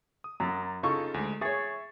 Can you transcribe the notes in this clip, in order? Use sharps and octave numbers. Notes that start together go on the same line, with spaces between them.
D#6
F#2 A#5 A6
C#3 D#4 F4 A4 C#6
D2 G#3
G#4 C#5 E5 C#6 A6